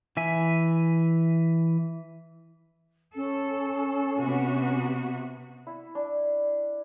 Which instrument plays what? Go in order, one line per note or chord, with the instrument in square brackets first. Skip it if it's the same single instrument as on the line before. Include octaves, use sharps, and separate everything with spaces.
[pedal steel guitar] E3 E5 G#5
[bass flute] C#4 [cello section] A4
[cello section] C3 B3 F#4
[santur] E4
D4